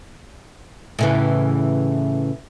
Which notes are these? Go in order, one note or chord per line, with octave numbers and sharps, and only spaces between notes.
A2 C#3 E3